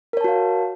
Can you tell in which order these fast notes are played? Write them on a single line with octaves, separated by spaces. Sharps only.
A#4 C#5 A5 F#4 F5